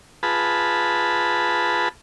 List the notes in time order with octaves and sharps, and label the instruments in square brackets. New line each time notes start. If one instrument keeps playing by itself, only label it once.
[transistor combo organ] F4 G#4 B4 A5 B5